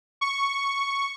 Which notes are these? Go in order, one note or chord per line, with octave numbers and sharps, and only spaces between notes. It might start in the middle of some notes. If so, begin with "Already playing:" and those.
C#6